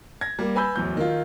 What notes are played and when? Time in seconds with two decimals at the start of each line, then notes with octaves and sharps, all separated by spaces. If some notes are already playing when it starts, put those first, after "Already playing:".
0.21 G#6 A#6
0.39 G3 A#3
0.55 B4 G#5 B5 E6 G6
0.76 D1 E2 F#3 G6
0.97 D#3 F4